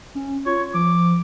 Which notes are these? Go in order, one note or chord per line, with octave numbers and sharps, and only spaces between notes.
C#4
F4 C#5
F3 D6